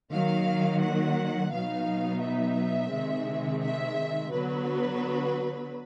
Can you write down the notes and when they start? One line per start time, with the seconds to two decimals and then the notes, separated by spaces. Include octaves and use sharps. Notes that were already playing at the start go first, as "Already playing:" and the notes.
0.11 D#3 F#3 A#3 F5
0.81 F#5
1.51 B2 F#3 B3 D#4 F5
2.21 E5
2.91 C3 D#3 G#3 C4
3.61 E5
4.31 D3 F#3 B3 B4